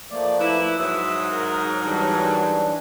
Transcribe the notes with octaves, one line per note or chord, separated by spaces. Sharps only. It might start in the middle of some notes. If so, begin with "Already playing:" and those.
F3 A3 A#3 D5
E4 B4
G#2 F#3 E5 D#6
A#4
E3 G3 D4